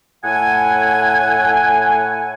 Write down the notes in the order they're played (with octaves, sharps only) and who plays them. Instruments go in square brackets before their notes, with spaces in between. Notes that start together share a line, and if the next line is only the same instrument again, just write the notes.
[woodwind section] A2 F#5 G#5